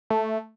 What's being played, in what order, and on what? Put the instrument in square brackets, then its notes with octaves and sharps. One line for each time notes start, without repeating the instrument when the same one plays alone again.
[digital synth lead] A3